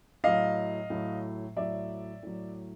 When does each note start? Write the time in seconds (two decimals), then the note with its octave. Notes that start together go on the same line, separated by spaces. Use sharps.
0.24 A2 F#3 D#5 F5
0.90 A2 F#3
1.56 A2 F#3 D5 E5
2.23 A2 F#3